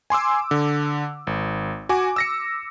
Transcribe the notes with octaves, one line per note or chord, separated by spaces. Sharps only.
G#5 C6 D6 E6
D3
G#1
F#4 G#5 D6
E6 A#6 C#7